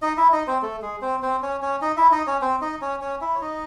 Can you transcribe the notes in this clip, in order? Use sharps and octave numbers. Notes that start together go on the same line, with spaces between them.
D#4 D#5
E4 E5
D#4 D#5
C4 C5
A3 A4
G#3 G#4
C4 C5
C4 C5
C#4 C#5
C#4 C#5
D#4 D#5
E4 E5
D#4 D#5
C#4 C#5
C4 C5
D#4 D#5
C#4 C#5
C#4 C#5
E4 E5
C#5
D#4 D#5